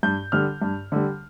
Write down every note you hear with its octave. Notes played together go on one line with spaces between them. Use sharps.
G2 G6
D3 G3 F6
G2
D3 G3